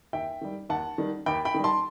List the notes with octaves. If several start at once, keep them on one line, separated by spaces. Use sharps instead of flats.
D#2 E5 G5
D#3 G3
D#2 F#5 A5
D#3 G3
D#2 G5 B5
G5 B5
D#3 G3
A5 C6